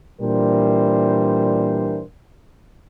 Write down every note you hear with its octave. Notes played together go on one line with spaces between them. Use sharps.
A#2 E3 G3 D4 A#4 C5